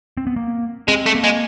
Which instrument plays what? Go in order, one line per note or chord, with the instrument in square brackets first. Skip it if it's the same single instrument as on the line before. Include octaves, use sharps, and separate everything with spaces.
[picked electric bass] C4
B3
A#3
[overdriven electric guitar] G#3 [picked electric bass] C4
[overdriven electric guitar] A3
[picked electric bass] A#3
[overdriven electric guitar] G#3